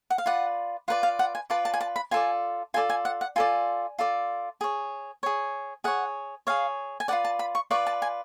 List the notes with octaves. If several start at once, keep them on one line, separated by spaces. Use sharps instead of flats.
F#5
F5
F4 B4 D5 F#5
F4 B4 D5 F#5
F5
F#5
G#5
F4 B4 D5 A5
A5
G#5
A5
B5
F4 A4 D5 G#5
F4 A4 D5 G#5
G#5
F#5
F#5
F4 A4 D5 G#5
F4 A4 D5
G#4 C#5
G#4 C#5
G#4 C#5 F#5
G#4 C#5 F5
G#5
F4 B4 D5 F#5
A5
B5
C#6
F4 B4 D5 C#6
A5
G#5